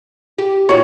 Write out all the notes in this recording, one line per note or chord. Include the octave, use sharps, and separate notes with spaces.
G4
A#2 D#4 F#4 C#5